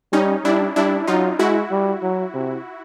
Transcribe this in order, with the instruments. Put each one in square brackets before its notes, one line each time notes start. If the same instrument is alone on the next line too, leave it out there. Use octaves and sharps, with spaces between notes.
[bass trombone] G3 [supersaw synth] C#4 D#4
[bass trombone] G3 [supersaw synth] D4 E4
[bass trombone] G3 [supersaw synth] D4 E4
[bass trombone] F#3 [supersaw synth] D#4 F4
[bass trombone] G#3 [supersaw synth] E4 F#4
[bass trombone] G3
F#3
C3